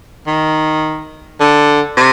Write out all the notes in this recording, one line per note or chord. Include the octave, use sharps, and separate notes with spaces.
D#3
D3
C3